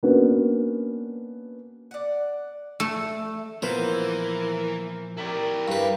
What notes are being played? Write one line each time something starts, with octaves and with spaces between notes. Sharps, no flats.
A#3 B3 C#4 D4 F#4 B4
D5 F#5
A3
A#2 E3 F3 B3 A#4 C5
E4 G4 A#4 D5
G2 B4